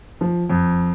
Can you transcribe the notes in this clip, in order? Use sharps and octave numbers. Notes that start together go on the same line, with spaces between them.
F3
F2